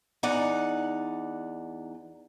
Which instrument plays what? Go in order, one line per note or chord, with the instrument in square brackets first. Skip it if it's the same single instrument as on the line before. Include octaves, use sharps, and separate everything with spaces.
[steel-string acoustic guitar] E2 D#4 D5 F#5